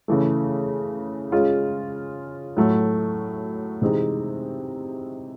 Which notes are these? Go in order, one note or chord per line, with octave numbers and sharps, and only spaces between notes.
C#3 E3 A3
G#3 C#4 F4
A2 F#3 A3
C3 E3 G#3 C4 D#4